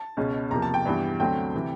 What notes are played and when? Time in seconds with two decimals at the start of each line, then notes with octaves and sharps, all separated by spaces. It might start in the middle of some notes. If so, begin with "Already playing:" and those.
Already playing: A5
0.17 C#2 B2 G#3 C#4
0.51 E2 C3 F3 A#3 A#5
0.62 A5
0.74 G5
0.85 G2 E3 G3 B3
1.20 D2 D3 F#3 A3 C4 G5
1.55 C3 E3